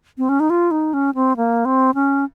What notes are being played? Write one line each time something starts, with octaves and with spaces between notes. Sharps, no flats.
C4
C#4
D#4
F4
D#4
C#4
C4
A#3
C4
C#4